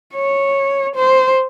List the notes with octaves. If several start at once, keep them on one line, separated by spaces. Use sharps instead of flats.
C#5
C5